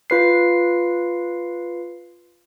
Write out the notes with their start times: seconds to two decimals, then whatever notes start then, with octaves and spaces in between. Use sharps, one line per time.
0.10 F4 B4 C7